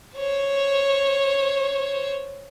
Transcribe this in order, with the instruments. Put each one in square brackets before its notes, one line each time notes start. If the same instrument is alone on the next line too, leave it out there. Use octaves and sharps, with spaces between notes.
[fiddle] C5 C#5